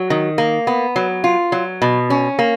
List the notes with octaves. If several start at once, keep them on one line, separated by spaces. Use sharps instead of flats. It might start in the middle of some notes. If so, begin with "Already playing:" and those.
Already playing: F#3
D#3
A#3
B3
F#3
F4
F#3
B2
C#4
A#3